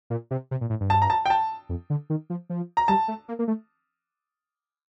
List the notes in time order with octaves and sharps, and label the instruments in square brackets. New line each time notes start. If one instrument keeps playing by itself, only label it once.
[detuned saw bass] A#2
C3
C3
A#2
A2
G2
[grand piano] A5
A#5
A5
G5
A5
[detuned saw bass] F2
D3
D#3
F3
F3
[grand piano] A#5
[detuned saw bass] G3 [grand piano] A5
[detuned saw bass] A3
A#3
A#3
A3